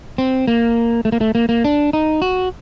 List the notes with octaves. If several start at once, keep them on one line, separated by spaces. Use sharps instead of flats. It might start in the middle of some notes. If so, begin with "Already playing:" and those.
C4
A#3
A3
A#3
A3
A#3
A#3
D4
D#4
F#4